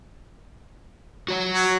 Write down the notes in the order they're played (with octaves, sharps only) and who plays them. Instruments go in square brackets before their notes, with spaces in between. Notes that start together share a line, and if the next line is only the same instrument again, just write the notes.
[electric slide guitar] F#4 C#5 F#5
[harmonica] F#3